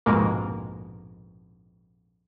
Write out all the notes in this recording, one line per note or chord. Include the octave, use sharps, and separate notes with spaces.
A#1 F2 G#2 B2 G#3 A#3